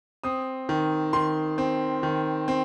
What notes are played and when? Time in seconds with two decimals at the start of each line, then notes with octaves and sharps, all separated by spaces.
0.24 C4 D#6
0.69 D#3
1.13 D#3 C6
1.58 C4
2.03 D#3
2.48 C4